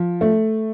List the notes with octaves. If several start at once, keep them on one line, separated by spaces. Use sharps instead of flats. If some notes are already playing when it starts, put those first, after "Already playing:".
Already playing: F3
A3